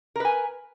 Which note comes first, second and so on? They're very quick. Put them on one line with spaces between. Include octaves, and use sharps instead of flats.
A#4 B4 G#5